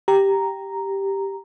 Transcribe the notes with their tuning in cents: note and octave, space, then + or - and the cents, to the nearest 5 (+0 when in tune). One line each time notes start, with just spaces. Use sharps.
G4 +0 A#5 +0